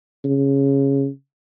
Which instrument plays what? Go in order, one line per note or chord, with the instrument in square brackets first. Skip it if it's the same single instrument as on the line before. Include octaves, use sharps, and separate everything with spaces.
[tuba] C#3